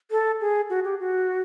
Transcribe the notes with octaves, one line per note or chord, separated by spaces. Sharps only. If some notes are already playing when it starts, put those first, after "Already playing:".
A4
G#4
F#4
G4
F#4